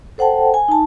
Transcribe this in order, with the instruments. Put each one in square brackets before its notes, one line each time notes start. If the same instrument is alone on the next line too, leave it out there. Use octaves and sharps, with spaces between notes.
[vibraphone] A4 C5 F#5 G5 A5
G#5
D#4 A5